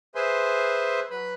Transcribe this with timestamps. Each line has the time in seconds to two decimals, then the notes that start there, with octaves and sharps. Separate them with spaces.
0.15 G#4 B4 C5 E5 G#5 C6
1.10 F#3 B4 B5